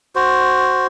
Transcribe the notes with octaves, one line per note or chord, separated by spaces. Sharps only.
F#4 C5